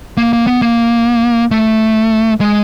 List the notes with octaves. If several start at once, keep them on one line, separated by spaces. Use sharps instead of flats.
A#3
A#3
B3
A#3
A3
G#3